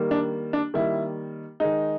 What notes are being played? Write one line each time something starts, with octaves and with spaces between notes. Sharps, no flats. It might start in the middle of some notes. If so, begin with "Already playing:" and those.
Already playing: D#3 G3 A#3
D4
D4
D#3 G3 A#3 E4
D#3 G#3 D#4